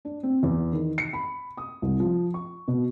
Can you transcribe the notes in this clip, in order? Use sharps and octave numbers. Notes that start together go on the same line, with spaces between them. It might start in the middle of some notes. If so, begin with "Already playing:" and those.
D4
C4
E2
D#3
C#7
B5
D#6
C2
F3
C#6
B2